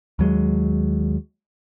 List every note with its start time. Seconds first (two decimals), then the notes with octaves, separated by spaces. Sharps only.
0.19 D#2 F#3 G#3